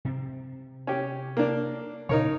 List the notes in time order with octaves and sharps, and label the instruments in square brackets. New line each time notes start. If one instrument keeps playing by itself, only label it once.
[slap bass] C3 C4
[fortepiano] C#4 G4
A#3 D4
[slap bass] D2 A#2 C#3 [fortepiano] D#4 A#4 C#5